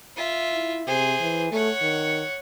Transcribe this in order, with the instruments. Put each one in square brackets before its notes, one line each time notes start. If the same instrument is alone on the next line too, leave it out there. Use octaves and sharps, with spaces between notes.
[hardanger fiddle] F4 E5
[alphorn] E4
[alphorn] C3 [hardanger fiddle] G#4 C5
[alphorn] E3
[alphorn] A3 [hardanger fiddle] C#5 F#5
[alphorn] D#3